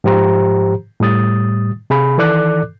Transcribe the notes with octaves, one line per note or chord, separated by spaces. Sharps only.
G#2 F3 G4 C5 A#5
A2 G3 D#6 A6
C3 G#4 B5
D#3 E3 A4 D5 D6 F#6